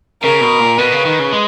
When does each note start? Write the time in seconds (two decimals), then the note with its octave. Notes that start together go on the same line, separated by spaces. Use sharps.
0.23 C#3 A#4
0.41 B2
0.60 A#2
0.78 B2 B4
0.92 C#3
1.05 D#3
1.19 C#3
1.33 G#3